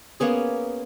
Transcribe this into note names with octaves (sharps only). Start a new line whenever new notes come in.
A#3 B3 C#4 G#4